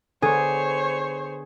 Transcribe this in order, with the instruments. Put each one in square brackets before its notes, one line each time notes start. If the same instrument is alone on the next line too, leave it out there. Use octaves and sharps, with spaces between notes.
[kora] D3 B3 [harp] G#4 [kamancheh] C5 C#5